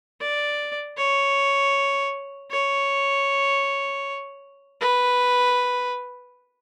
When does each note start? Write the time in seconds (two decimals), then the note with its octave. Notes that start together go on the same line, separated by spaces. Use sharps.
0.20 D5
0.97 C#5
2.51 C#5
4.81 B4